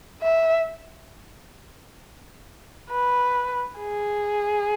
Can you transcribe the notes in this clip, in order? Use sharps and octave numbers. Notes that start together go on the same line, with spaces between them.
E5
B4
G#4